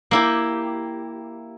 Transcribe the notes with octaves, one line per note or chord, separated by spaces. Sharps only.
A#3 E4 G4